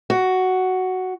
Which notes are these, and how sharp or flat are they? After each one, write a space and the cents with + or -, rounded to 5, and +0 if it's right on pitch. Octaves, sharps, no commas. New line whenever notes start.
F#4 +5